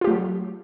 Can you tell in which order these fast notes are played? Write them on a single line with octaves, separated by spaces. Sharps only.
F4 G4 A3 F#3